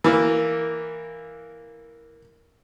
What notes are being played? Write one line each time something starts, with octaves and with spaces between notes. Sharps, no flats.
E3 A#3